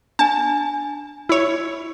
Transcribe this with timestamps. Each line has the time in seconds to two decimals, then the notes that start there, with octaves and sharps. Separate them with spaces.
0.19 D4 G#5 A5
1.29 E4 C#5